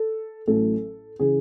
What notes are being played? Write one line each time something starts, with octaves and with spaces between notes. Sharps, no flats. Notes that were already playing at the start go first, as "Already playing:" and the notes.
Already playing: A4
A1 A2 F#3 A4
C#3 E3 G#4